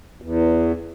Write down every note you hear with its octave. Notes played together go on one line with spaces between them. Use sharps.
E2